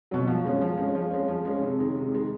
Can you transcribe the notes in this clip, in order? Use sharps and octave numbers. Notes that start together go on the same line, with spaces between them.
B2 F#3
F3
G#3 C#4
F3
G#3 C#4
F3
G#3 C#4
F3
G#3 C#4
C3
D#3 G#3
C3
D#3 G#3